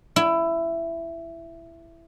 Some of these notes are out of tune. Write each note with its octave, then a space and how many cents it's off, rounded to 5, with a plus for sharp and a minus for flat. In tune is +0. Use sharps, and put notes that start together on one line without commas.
E4 +15